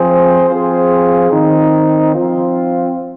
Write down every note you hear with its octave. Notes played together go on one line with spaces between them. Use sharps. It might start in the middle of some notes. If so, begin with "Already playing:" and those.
Already playing: F3 C4 G#4 C5
F3 C4 F4 G#4 C5
D#3 C4 D#4
F3 C4 F4